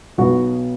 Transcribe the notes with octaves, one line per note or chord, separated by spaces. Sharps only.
B1 B2 F#3 B3 F#4